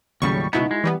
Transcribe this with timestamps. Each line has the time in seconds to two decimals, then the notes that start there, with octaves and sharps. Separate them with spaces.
0.22 D#2 A2 C#3 F#3 G3 C#6
0.53 C#2 B2 B3 D#4 E4 F#4
0.71 G#3
0.84 E3 G3 B3